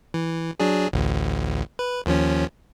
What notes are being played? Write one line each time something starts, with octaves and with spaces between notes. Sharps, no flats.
E3
F#3 D4 G#4
A1 D2
B4
D#2 F3 C#4